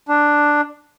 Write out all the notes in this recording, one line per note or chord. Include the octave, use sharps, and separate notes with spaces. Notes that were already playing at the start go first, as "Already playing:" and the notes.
D4